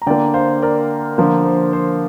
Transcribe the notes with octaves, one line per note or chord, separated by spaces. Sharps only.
A#5
D3 A#3 D5 G5
C5 F5
A#4 D5
D3 F3 A#3 C5
C5
C5